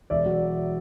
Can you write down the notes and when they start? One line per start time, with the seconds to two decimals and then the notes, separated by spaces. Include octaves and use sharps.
0.10 E1 D5 E5
0.26 F#3